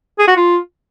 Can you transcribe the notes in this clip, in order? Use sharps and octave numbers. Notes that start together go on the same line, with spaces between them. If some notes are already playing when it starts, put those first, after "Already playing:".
G#4
F#4
F4